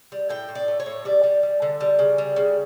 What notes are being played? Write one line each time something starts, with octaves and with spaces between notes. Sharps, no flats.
G3
A2 G5
A2
D5
A3
C#5
A2
G3 D5
G3
G3
D3
G3
C#3
G3
C#3